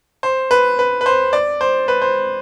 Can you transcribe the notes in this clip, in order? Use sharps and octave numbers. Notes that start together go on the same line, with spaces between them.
C5
B4
B4
B4
C5
D5
C5
B4
C5